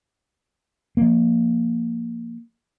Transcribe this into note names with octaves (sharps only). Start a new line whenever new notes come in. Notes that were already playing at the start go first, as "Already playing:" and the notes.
F3 A#3